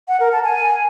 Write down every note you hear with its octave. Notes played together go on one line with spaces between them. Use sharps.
F#5
A#4
A5
G#5